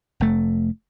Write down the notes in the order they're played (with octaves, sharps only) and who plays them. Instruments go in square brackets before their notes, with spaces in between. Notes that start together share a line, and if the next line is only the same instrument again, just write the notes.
[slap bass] F1 A3